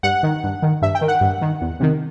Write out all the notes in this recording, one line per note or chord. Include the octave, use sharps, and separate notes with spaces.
G2 F#5
D#3
G2
D#3
G2 E5
G5
D#3
F#5
G2
D#3
E2
C3 D#3